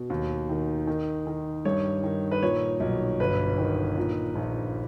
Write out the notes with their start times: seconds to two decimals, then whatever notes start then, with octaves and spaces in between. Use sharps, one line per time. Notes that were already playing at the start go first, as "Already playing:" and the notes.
Already playing: B2
0.10 D#2
0.49 D#3
0.87 D#3
1.27 D#3
1.65 G2 C#5
2.04 D#3
2.31 B4
2.42 A#2 C#5
2.80 B1
3.20 G1 B4
3.58 D#3
3.97 A#2
4.35 A#1